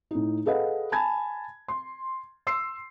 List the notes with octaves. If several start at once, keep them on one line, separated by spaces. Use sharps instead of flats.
A2 D#4
G#4 A4 B4 D#5 F5 F#5
G#5 A5 B5 G#6
C6
C6 E6 C7